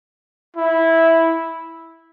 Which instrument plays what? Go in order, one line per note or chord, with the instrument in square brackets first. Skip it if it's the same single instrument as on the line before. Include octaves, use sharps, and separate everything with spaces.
[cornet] E4